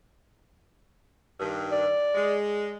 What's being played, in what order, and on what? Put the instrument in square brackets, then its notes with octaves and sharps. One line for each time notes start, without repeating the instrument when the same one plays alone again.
[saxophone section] G2 D#3
[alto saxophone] D5
[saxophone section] G#3